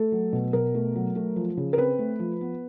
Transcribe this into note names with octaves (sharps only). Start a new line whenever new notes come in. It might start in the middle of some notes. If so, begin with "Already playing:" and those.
Already playing: A3 A4
F#3
B2
B2 A#4
A3
F#3
A3
F3
C#3
A#4
C4 B4
A3
F3
B3